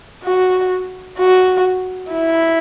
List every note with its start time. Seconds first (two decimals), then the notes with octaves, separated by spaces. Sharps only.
0.24 F#4
1.18 F#4
2.11 E4